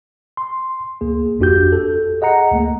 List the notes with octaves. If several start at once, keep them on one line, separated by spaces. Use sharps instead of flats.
C6
D2 A#3 G#4
G#1 F2 D4 F#4 G4 G6
A4
G#4 D#5 F#5 A#5 C#7
D2 A3 A#3